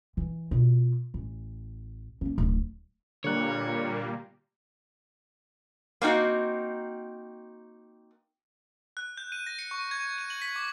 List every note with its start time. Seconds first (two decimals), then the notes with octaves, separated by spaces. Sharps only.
0.17 E3
0.51 B2 F4
1.14 A1
2.21 A#3 C#4
2.38 D1
3.24 A#2 D3 G3 A#3 C#5 F#6
6.02 A#3 C4 D#4 F#4
8.97 F#6
9.17 G6
9.32 D#7
9.47 A#6
9.59 C#7
9.71 C#6
9.91 G#6
10.18 D#7
10.30 F#7
10.42 B6
10.56 D6